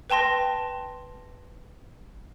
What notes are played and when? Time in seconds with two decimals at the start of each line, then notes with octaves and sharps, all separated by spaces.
0.10 B4 G5 A5 C6 A#6